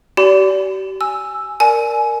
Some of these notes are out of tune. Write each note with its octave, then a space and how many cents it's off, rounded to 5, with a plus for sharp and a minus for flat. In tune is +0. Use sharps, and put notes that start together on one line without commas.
G4 -40 D5 -30 B5 +40
G#5 +0 E6 +0
A#4 +0 D5 +5 G#5 +25